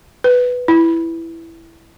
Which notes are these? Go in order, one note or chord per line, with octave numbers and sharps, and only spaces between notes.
B4
E4